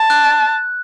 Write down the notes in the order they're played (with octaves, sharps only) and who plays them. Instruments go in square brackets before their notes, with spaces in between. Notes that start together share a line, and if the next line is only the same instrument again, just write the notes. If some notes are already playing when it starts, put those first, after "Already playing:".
Already playing: [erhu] A5
[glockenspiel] F#6